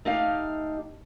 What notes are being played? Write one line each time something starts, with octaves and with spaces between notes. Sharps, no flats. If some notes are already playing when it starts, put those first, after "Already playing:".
A3 D#4 G4 F5